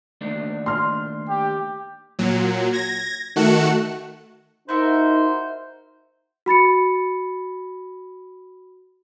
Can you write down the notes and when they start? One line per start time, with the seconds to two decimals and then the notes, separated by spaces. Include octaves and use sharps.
0.21 D#2 A3 D4
0.66 C6 F6
1.30 G4
2.19 A#2 F#3
2.73 G#6 A#6
3.36 D#3 A3 F#4 F#6 C#7 E7
4.69 D#4 E4 F#4 A#4 C5 E5
6.46 F#4 B5 A6 C#7